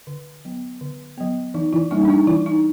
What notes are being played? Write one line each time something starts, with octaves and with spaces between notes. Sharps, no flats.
D3
F#3 B3
D3
F#3 B3
E3 D#4
E3 E4
G3 A#3 C#4 D#4
D4
D#4
E3 E4
D#4